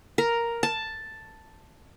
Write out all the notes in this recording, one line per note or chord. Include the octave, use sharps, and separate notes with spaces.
A#4
A5